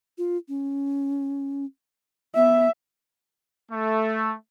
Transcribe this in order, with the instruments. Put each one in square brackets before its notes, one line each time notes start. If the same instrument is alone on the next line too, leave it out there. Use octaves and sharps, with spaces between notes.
[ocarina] F4
C#4
[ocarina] B3 [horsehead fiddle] E5
[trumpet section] A3